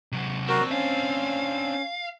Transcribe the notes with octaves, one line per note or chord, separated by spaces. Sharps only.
C3 F#3
C4 D4 F#4 A#4
C#4 F5